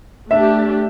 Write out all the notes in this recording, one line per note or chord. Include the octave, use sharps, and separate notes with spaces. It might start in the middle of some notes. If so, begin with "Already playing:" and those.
A3 D4 G4 E5